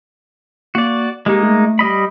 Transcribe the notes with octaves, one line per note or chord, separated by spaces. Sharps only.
A#3 F#4 D5
G#3 A#3 D#4 G4
A3
G3 D#5 B5